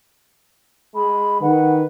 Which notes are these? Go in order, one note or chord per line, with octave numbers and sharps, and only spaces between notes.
G#3 B5
D#3 B4 F#5